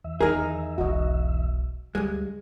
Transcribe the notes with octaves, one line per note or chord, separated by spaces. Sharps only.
E2 E5
D#3 F3 D#4 G#4 A#4
E1 B1 F#4 D#5
D2 G2 G#3